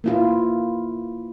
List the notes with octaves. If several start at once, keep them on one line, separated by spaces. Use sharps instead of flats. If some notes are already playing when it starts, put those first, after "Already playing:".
A#3 E4 F4